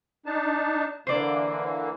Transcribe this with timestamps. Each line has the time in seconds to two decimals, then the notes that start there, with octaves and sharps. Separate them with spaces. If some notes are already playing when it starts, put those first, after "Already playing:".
0.26 D4 D#4 A5
1.07 D3 E3 A#3 C5 D5